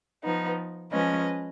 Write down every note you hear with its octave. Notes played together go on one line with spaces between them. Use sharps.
F3 B3 D#4
F3 G#3 C#4 B4 D#5